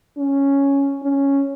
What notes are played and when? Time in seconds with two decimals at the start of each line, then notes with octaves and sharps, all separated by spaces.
0.17 C#4
1.02 C#4